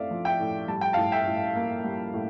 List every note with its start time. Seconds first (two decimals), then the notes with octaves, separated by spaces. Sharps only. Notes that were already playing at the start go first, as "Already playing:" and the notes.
Already playing: A2 A3 C4 D5 E5 F5
0.11 F3
0.25 E5 G5
0.40 A2
0.68 G3 A5
0.81 G5
0.93 A2 F5 A5
1.12 E5 G5
1.27 A2
1.55 A#3
1.85 G3
2.14 A2